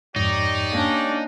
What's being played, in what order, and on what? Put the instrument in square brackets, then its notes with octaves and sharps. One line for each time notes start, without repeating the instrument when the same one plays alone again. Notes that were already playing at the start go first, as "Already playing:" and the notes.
[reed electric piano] F2 G#2 [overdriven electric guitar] D#4 [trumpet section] G4 C#5 D5
[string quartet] A#3 C#4 D4